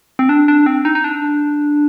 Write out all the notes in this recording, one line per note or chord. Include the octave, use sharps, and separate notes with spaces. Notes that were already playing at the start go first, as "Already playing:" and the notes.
C4
D4
D4
C4
D#4
D#4
D4